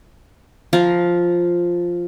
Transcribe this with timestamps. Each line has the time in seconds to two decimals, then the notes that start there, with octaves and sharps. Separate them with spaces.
0.73 F3 F4 A#5